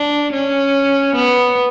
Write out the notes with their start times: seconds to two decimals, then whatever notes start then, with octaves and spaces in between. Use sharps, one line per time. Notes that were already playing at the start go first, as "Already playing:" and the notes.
Already playing: D4
0.32 C#4
1.16 B3